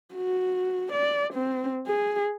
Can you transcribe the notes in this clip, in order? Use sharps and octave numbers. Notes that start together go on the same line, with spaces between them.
F#4
D5
C4
G#4